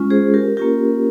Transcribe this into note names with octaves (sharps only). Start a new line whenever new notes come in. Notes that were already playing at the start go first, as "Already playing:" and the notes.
Already playing: G#3 C#4 F4
G#4 C5
G4 A#4
A#3 C#4 F4 G4 A#4